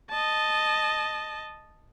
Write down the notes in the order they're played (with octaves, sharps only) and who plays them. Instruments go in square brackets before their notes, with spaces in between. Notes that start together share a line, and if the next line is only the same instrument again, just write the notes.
[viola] D#5 A5